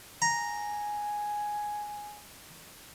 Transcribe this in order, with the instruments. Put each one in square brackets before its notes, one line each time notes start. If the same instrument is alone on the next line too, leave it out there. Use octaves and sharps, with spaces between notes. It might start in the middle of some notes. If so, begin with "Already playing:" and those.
[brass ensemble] G#5 [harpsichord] A#5